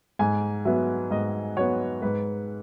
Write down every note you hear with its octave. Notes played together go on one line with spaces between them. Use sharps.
G#2 G#5
F#3 B3 E5
G#2 D#5
F#3 B3 C#5
G#2 B4